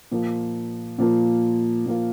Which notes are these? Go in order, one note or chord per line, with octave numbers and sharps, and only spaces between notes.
A#2 F3 A#3 F4
A#2 F3 A#3 F4
A#2 F3 A#3 F4